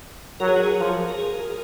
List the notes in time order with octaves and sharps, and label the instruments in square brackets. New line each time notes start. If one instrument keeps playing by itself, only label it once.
[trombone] F#3 [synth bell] A#4
[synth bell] G#4
F#4
G#4
[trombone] F3
[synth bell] A#4
G#4